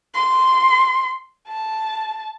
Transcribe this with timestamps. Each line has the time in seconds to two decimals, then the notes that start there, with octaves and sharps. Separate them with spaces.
0.14 C6
1.48 A5